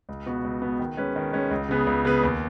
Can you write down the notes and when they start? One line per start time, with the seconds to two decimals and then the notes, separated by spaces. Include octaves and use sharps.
0.09 C#2
0.26 B2 B3 F#4 B4
0.44 C#2
0.61 B2 B3 F#4 B4
0.79 D#3
0.97 G#3 C#4 B4
1.16 D#3
1.33 G#3 C#4 B4
1.51 C#2
1.69 C#3 B3 G#4 B4
1.87 C#2
2.05 C#3 B3 G#4 B4
2.23 D#2